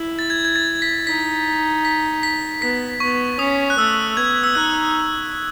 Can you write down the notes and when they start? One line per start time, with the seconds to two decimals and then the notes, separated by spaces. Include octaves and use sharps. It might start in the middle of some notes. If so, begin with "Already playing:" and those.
Already playing: E4
0.19 A6
0.30 G#6
0.45 G#6
0.56 A6
0.82 B6
1.07 D#4 B6
1.85 B6
2.23 B6
2.62 B3 B6
3.00 B3 C#6
3.39 C#4 D#6
3.70 F#6
3.78 A3 E6
4.17 B3 G#6
4.44 E6
4.55 D#4 F#6